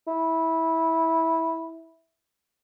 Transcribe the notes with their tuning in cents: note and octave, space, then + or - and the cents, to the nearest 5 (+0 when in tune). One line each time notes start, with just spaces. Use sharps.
E4 -15